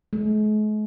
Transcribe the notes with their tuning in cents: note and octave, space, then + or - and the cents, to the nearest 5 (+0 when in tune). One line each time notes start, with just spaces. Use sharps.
G#3 +45